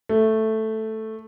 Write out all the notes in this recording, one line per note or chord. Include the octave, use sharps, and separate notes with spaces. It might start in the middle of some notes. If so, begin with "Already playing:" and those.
A3